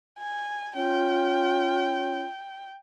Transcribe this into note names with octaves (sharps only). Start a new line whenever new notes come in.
G#5
C#4 F4 G5